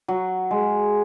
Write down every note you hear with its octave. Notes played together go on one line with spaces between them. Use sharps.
F#3
G#3